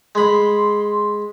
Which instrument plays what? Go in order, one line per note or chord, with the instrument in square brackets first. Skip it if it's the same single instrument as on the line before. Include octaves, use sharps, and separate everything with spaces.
[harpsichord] G#3 B5 [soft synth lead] C6